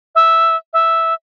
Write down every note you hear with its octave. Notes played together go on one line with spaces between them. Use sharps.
E5
E5